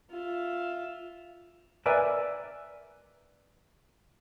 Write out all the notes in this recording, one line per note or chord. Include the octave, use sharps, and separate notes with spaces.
F4 E5
A#4 B4 D5 E5 G#5